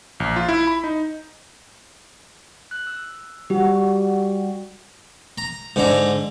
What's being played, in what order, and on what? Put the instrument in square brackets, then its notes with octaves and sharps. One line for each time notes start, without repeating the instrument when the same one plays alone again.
[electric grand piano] A#1
F4
E4
B5
D#4
[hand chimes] F#6
E6
[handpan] G3 F#4 [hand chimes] G4
[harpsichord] A#5
G#2 D3 A#5